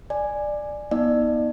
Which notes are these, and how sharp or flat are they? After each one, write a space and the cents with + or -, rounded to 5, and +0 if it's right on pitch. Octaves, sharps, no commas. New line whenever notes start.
D5 +15 G#5 +0
B3 -30 D#4 +15 D5 +35